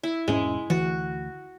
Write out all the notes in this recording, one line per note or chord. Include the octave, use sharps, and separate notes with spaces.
E4
E1 G#2 G#3 C#4
D2 E3 F#4